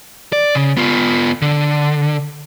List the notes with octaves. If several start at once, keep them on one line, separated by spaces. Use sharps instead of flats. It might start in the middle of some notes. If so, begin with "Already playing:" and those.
D5
C#3
B3 F4
D3